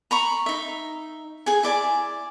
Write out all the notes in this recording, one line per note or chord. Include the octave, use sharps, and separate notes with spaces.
A#5 B5 C#6
D#4 E5
G#4 G#5
E4 D5 G#5